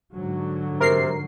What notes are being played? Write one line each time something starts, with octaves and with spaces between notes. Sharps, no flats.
G#2 D3 F#3
C3 A#4 C7